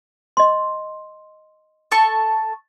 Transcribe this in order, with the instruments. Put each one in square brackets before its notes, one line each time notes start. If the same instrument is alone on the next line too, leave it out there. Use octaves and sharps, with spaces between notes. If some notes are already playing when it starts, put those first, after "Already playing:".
[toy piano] D#5 C6
[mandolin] A4 A5 C#6